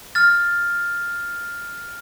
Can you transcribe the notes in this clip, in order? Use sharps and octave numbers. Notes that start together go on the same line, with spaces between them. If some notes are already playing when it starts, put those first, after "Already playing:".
F6 A6